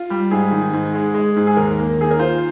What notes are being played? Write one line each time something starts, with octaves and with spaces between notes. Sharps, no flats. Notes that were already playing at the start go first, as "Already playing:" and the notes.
Already playing: F4
G3
G#2 G#4
D#3
G#2
G#3
G#3
G#2
G#4
D#2 A#4
A#3
D#3 G#4
A#4
F4 C5